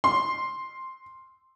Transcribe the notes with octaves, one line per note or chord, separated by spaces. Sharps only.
C6